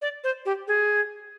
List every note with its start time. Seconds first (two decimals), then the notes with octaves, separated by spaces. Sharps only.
0.02 D5
0.24 C5
0.46 G4
0.68 G#4